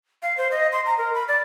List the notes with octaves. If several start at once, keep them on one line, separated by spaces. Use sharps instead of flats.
F5
C5
D#5
C6
A#5
A#4
B5
D5